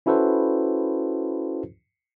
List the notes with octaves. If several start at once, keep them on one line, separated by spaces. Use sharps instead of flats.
C#4 E4 F#4 A4 B4 C5